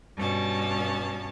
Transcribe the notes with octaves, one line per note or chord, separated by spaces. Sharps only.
G2 B2 C#4 A5